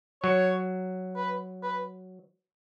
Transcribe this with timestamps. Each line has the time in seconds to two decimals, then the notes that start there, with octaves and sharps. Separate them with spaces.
0.23 F#3 C#5
1.16 B4
1.63 B4